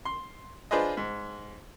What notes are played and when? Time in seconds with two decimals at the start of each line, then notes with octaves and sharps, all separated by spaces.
0.05 C6
0.71 D4 F4 G#4 B4 C5 D#5
0.97 G#2